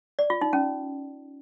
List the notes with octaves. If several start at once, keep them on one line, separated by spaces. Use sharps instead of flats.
D5
F4
D#4
C#4